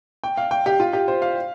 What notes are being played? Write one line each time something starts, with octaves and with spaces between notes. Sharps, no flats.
G5
F5
G5
G4
F4
G4
C5
F5